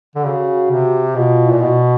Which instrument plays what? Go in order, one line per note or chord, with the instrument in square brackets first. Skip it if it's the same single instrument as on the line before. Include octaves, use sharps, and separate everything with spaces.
[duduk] D3
[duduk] C#3 [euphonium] F#4
[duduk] C3
[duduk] B2 [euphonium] F4
[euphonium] E4
[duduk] A#2
B2